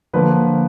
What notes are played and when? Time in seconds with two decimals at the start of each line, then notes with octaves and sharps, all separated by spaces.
0.13 D3 F3 A#3 B4